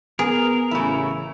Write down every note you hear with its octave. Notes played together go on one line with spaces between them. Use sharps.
B3 G#4 A#4
A1 C#3 E4